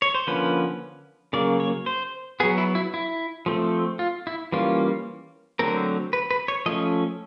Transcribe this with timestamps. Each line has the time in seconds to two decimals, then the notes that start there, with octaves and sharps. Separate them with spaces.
0.02 C#5
0.15 C5
0.27 D3 F3 A#3 C#4 B4
1.33 C#3 F#3 A#3 D5
1.60 C#5
1.86 C5
2.40 B3 G#4
2.44 F#3
2.58 E4
2.75 E4
2.94 E4
3.46 F3 A3 C4
3.99 F4
4.27 E4
4.52 E3 G3 A#3 C#4 F4
5.59 D3 F#3 A3 C4 A#4
6.13 B4
6.31 B4
6.48 C#5
6.66 F3 A3 C#4 D#5